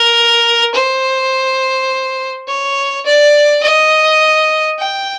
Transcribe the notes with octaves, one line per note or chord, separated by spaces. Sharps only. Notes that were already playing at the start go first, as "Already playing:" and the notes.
Already playing: A#4
C5
C#5
D5
D#5
G5